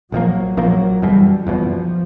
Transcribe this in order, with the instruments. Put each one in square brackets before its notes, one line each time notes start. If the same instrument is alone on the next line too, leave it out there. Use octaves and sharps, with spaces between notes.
[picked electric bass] A#1 A#2 F3 A#3 [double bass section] F#3
[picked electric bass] A#1 A#2 F3 A#3 [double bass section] F#3
[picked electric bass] F#1 E2 B2 [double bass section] G3
[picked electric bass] F#1 E2 B2 [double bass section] F3